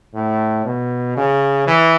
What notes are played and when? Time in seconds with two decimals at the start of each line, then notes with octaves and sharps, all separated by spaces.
0.14 A2
0.65 B2
1.17 C#3
1.67 E3